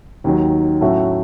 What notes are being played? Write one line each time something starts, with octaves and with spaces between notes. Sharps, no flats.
D#2 D#3 F#3
A2 F#3 A3 C#4 F#4